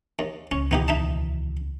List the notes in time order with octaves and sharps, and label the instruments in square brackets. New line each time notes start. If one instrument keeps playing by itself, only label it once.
[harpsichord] D#2
[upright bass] C#2 [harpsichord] C#4
[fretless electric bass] D#2 B2 E3 [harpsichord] B3 D#4 G4
[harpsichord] D#4 E5 A5